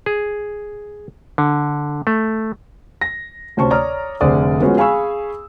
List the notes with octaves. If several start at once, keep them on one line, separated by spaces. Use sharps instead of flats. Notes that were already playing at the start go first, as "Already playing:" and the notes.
G#4
D3
A3
A#6
D2 C3 C#4 C5 A5 C#6
C#5 D5 A#5 D#6 F6
F1 D3 G#4 C5 D5 D#6
F3 G#3 B3 C#4 F#4 G#4
G#4 F5 G#5 B5 C#6 E6